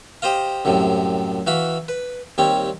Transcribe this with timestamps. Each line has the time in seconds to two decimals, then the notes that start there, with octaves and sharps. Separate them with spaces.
0.22 G4 C5 D#5 F5
0.65 C2 F#2 A2 C3
1.47 E3 F#4 F5 B5
1.88 B4
2.38 D#2 G3 C4 C#5